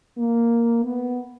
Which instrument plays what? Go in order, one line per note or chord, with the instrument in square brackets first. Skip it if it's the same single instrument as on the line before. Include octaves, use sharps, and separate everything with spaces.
[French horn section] A#3
B3